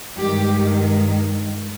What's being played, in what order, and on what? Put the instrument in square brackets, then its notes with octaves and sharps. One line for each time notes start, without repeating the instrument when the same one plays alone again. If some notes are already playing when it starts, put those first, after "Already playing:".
[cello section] G2 D#3 G#3 G4